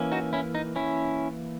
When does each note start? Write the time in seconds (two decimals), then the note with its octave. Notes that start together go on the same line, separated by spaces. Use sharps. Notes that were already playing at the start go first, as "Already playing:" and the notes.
Already playing: E3 A#3 C#4
0.12 D#4 F#4
0.33 C#4 E4
0.55 D#4
0.76 C#4 E4